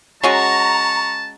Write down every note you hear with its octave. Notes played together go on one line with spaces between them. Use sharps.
G#3 C#4 F#4 A5 A#5 C#6